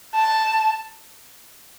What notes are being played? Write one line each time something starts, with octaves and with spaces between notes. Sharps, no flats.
A5